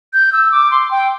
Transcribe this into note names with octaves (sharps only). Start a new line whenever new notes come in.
G6
E6
D6
C6
G5